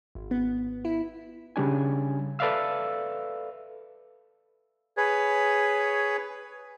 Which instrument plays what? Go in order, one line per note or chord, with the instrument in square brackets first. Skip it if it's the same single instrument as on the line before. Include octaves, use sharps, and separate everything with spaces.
[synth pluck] G#1
B3
E4
[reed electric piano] C#3 G3 D4 G#5
A4 B4 D5 E5 F5 E6
[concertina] G#4 B4 C#5